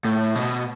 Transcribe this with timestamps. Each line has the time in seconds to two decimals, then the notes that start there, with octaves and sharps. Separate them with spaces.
0.05 A2
0.35 B2